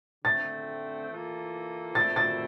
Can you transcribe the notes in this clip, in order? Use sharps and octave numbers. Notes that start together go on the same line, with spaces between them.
D3 A3 C4 A6
E3 A#3 F4 A4
A#2 A3 C4 E4 A6
A6